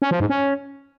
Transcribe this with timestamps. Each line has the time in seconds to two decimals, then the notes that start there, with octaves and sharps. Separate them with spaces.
0.02 C#4
0.11 F3
0.20 G#2
0.29 C#4